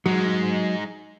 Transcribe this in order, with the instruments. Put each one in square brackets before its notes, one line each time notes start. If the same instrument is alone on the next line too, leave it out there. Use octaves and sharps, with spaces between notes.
[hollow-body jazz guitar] F#3 [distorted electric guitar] G#3 D#4